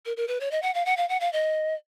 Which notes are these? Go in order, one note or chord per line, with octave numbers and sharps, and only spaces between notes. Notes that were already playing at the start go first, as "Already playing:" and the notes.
A#4
A#4
B4
C#5
D#5
F#5
F5
F#5
F5
F#5
F5
D#5